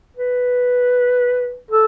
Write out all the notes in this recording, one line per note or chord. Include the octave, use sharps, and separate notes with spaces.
B4
A4